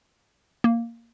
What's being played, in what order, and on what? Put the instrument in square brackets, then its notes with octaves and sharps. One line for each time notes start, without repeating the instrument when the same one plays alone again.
[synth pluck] A#3